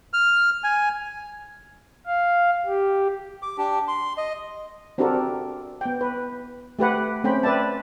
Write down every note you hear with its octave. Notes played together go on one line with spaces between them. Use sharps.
F6
G#5
F5
G4
D6
D4 G4
C6
D#5
C4 D4 F#4 G4 A4 A#4
B3 G5
B4
A3 G4 B4 F#5
A3 C4 C#4 C5 G5 B5
B4 D5 E5 A5